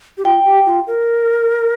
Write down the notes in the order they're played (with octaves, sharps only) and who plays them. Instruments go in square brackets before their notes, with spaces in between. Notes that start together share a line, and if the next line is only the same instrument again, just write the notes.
[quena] G4
[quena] F4 [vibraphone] G5
[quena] G4
F4
A#4